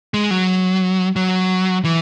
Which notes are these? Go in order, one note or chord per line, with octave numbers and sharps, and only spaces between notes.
G#3
F#3
F#3
E3